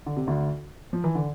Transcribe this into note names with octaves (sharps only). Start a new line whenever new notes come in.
D3
C3
D2 D3
F3
E3
D3